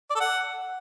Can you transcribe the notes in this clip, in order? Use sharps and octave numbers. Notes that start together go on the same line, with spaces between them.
D5
A4
F#5